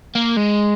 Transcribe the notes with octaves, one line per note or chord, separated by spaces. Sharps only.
A#3
G#3